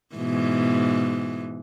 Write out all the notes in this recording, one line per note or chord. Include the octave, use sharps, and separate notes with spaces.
G#2 B2 E3